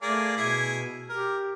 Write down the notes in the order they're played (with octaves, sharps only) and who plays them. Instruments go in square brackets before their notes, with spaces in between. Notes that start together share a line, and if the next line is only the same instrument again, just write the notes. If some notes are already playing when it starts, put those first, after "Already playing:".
[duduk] A3 [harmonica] A#3 G#4 D5
[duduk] B2 [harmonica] E4 G#4
[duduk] G4 [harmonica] A#4